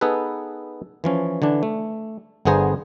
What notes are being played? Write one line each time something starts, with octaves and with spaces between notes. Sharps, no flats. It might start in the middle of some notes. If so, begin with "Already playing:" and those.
B3 D#4 G#4 A4 B4
E3 F3 C#4
D3 E3 D4
A3
G1 D3 B3 G#4 C5 A#5